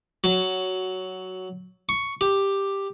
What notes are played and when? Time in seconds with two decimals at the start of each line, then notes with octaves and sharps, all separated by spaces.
0.24 F#3
1.89 C#6
2.21 G4